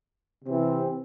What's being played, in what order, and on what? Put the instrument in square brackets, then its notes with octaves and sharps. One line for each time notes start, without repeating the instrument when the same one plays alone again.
[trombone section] C3 E3 C4